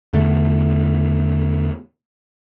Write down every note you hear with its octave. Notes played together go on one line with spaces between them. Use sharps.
E2 D3 A3